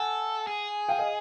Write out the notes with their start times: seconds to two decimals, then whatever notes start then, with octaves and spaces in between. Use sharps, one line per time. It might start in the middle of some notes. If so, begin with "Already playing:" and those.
Already playing: A4 F#5 G#5
0.47 G#4
0.88 F5 G5
0.99 D#5 F5